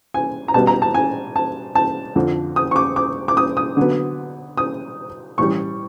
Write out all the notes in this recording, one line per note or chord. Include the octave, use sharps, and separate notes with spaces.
G#5
A#5
B2 G3 B3 A5
A#5
A5
G#5
A5
A5
F2 D3 F3
D#6
C#6
D6
D6
D6
D#6
D#6
D3 F#3 B3
D#6
A2 E3 G3 C#6